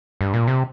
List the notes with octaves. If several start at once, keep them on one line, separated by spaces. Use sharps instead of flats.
G2
A#2
C3